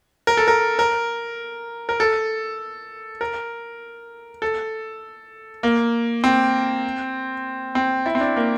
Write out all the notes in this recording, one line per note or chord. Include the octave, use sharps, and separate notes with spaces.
A#4
A4
A#4
A#4
A#4
A4
A#4
A4
A#3
C4
C4
E4
C4
D4
A#3